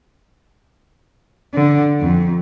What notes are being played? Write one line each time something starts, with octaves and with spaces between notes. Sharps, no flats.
D3
F2